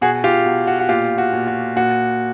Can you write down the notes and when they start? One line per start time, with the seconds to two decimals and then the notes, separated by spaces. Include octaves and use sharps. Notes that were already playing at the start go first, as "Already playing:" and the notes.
0.01 B2 F#4 G#4
0.24 F4 G4
0.46 B2
0.67 F#4
0.79 F#4
0.89 A#2 F4 G4
1.18 F#4
1.33 A#2
1.47 F#4
1.76 A#2 F#4